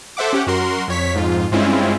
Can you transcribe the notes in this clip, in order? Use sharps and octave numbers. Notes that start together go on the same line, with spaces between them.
A4 C5 E5 F#5 D6
C#4 G4 F#5
F#2 F#4 A#4 C6
F2 C#5 B6
F2 G#2 F4
G2 G#3 C4 C#4 E4 F4